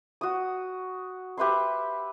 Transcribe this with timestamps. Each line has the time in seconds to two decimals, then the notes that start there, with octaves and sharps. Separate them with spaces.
0.21 F#4 D#6
1.37 G4 B4 E5 C6